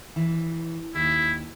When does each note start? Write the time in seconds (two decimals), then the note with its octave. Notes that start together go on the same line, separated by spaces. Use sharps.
0.16 E3
0.95 D#2 E4